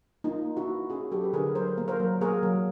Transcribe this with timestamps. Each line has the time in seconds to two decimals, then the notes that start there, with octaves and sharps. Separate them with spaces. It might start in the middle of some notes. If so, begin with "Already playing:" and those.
0.24 A#3 D#4 F4
0.46 A#3
0.57 E4 F#4
0.67 A#3
0.90 C#4 F#4 G#4
1.11 F#3 G4 A4
1.24 B4
1.33 D3 G#4 A#4
1.55 F#3 A#4 C5
1.78 A#3
1.88 A#4 C5
1.99 F#3
2.21 A#3 G#4 A#4
2.43 F#3